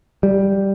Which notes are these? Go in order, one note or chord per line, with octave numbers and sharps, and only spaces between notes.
G3